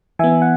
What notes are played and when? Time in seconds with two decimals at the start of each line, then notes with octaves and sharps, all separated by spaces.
0.19 E3 B3 E5 G#5
0.42 F#5